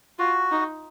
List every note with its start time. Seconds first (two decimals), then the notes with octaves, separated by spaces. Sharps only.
0.19 F4 F#4
0.51 D#4